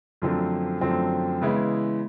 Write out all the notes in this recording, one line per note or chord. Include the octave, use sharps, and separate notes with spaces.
F#2 D3 F3 A3 C4
F#2 D3 F3 A3 C4
C#3 E3 G#3 B3 E4